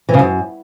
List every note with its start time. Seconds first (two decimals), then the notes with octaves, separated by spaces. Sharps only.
0.09 E3
0.14 C#3
0.19 F#2